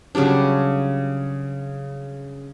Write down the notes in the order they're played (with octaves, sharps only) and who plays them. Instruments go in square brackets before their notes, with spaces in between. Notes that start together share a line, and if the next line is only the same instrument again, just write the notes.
[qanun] C#3 F#3 G3 D4